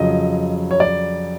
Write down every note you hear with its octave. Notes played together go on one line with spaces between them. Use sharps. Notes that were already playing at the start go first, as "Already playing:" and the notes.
Already playing: F2 C#3 F#3 D#5
C#5
D5